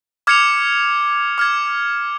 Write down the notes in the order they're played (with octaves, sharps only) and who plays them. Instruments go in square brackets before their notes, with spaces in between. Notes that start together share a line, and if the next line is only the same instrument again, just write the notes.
[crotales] D6 F6 G#6 C#7 F7
D6 F6 G#6